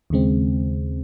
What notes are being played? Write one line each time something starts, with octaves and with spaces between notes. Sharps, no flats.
D#2 C#3 G#3 C4